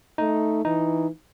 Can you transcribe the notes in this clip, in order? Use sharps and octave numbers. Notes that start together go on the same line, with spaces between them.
A3 D#4
E3 D#4